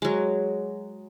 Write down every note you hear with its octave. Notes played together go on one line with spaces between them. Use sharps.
F#3 G#3